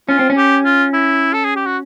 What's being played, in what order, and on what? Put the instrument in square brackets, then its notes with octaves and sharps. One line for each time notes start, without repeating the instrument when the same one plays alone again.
[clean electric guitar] C#4 [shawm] F4
[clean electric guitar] C4
C#4
[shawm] G4
F4
E4
A4
G#4
G4
F#4